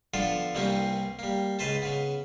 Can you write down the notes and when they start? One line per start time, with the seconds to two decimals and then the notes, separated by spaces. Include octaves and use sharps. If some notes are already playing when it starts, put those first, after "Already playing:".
0.14 D3 F3 B3 D4 F4 A4
0.55 C2 E3 G3 A#3 C4 C#6
1.19 G3 A#3
1.59 C#2 C#3 B4 C5 A5
1.82 C#3 B3